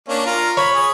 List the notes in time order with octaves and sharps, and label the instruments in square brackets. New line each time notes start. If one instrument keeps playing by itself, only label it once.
[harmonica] A#3 C#4 D4
F4 A#4
[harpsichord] C#5 [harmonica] B5
[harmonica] G#4